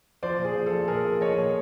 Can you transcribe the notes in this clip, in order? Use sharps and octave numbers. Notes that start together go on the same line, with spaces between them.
F3 C5 D5
A#2
G#4
F3
A4
F3
A#2 G#4 A#4
F3
F3 C#5 D#5
A#2